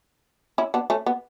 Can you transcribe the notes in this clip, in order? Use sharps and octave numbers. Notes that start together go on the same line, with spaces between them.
C#4 E4
B3 D4
A3 C#4
B3